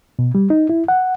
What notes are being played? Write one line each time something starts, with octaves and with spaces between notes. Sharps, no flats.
B2
G3
D#4
E4
F#5